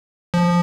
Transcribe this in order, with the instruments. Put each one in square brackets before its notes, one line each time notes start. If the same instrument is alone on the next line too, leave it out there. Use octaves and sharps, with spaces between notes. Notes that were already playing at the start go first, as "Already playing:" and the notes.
[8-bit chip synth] F3